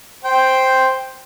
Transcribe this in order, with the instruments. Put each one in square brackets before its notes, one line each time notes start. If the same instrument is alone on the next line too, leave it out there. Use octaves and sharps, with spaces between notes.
[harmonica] C5 G5